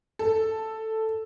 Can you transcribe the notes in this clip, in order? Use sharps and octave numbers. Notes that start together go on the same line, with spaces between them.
A4